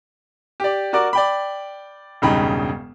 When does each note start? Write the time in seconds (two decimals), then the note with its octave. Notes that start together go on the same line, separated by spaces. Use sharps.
0.60 G4 D5
0.93 F#4 A#4 D5 D6
1.13 D5 G5 B5
2.22 E1 G2 C#3 D#4 G5 B5